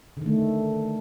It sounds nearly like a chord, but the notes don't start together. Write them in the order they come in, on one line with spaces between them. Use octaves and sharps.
D3 D#3 A3